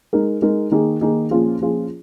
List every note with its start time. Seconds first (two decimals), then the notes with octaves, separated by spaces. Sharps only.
0.13 G#3 D#4 A#4
0.42 G#3 D#4 A#4
0.71 D#3 A#3 D#4 G#4
1.01 D#3 A#3 D#4 G#4
1.31 A#2 F3 C#4 F4 G#4
1.60 A#2 F3 C#4 F4 G#4